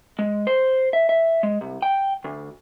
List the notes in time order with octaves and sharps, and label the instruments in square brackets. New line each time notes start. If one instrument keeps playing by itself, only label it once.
[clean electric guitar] G#3
C5
E5
E5
G#3
C2
G5
D2